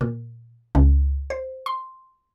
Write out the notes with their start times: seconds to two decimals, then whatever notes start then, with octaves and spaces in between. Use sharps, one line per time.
0.01 A#2
0.75 C#2
1.30 C5
1.66 C6